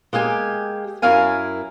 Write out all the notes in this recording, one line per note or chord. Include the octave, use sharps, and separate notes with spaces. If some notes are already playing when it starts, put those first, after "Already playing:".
G#3 A#3 G4 G#5
F#2 E4 A#4 F5 G#5